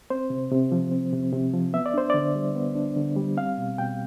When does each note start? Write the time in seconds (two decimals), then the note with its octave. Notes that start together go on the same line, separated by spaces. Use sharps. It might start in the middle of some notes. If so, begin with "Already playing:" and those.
0.10 C4 C5
0.30 C3
0.51 C3
0.72 F3
0.91 C4
1.12 C3
1.32 C3
1.54 F3
1.73 B3 E5
1.86 D5
1.94 D4 C5
2.10 D3 D5
2.35 G3
2.55 B3
2.75 D4
2.96 D3
3.17 G3
3.37 C4 F5
3.58 B2
3.78 B2 G5